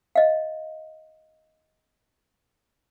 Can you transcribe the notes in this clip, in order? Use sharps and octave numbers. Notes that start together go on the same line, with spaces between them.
D#5 F5